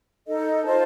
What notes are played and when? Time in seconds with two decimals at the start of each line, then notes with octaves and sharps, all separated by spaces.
0.26 D#4 A4 D#5
0.64 F4 C5 D#5 A5